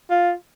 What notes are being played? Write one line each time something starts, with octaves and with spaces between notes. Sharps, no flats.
F4